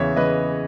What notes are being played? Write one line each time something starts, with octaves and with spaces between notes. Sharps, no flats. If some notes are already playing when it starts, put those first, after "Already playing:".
Already playing: E2 C#3 E3 C#5 E5
C#3 E3 B4 D#5